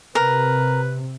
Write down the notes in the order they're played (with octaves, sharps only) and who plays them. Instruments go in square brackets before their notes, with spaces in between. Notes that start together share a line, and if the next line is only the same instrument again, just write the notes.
[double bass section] C3 [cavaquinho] A#4 [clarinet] B4